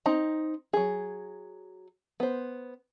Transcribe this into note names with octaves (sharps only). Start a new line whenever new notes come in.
C4 D#4 A#5
F#3 G#4
B3 C5